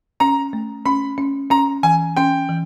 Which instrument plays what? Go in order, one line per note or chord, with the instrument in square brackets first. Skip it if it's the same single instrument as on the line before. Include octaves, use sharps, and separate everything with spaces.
[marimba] C#4 [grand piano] A#5
[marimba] A3
[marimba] C#4 [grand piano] B5
[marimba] C#4
[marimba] C#4 [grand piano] A#5
[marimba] E3 [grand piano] G#5
[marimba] C#4 [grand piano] G5
[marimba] E3